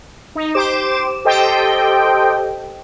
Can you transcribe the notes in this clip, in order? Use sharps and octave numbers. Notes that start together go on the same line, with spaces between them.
D#4
G4 C5 D6 E7
G4 A4 C5 D#5 G5